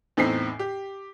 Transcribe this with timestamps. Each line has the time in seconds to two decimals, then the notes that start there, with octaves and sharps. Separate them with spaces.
0.17 E2 A2 C4 D#4 B6 C7
0.59 G4